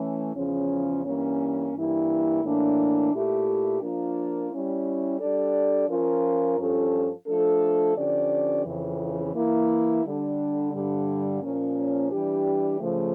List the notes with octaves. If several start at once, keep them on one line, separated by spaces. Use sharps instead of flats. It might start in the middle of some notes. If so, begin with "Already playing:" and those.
Already playing: E3 A3 C#4
E2 C#3 F3 C#4
G2 E3 A#3 C#4
G2 E3 A#3 E4
A2 E3 A#3 D4
A#2 A3 E4 G4
F3 A#3 D4 F4 A#4
G3 C#4 E4
G3 D4 A4 D5
F3 C#4 F4 A#4
G2 F3 C#4 F4 A4
F3 A3 D4 A4
D3 F3 C#4 G4 D5
F2 C#3 E3
E3 A#3 E4
D3 G3 D4
G2 D3 G3
A#2 F3 A#3 C#4
E3 G3 D4 G4
C#3 F3 A3